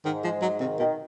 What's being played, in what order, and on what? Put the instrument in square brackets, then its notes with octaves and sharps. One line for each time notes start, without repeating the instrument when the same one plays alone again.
[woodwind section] G#2 [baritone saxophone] D#3
[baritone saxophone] F3 [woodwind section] G#3
[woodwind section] G#2 [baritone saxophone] F#3
[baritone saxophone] C3 [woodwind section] D#3
[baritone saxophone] B2 [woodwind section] D#3